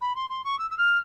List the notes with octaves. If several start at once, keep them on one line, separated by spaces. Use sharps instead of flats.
B5
C6
C6
C#6
E6
E6
F6